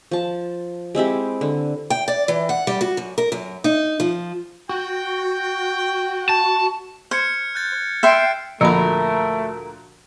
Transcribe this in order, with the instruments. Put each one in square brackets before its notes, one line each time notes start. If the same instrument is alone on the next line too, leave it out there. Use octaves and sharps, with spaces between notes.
[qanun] F3 A5
G#3 C4 E4 G4
D3
[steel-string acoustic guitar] G5
D5
E3
F#5
G3
F#4
F#2
A#4
F#2
D#4
F3
[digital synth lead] F#4 [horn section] G5
[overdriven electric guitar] A5
[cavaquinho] C5 [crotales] F6 G#6 C#7
[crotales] F#6 G6 A6
[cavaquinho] E5 G5 C6 [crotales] F6 C7 D7
[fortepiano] D2 A#2 F#4 [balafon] F3 B5 [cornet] A3 [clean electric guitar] A#4